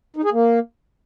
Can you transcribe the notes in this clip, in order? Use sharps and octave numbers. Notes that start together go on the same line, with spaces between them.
D#4
G#4
A#3